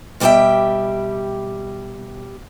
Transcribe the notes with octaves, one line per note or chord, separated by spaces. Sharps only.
B2 G3 G4 B4 E5 G5